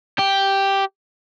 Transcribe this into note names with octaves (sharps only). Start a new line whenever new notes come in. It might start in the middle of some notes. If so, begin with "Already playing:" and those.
G4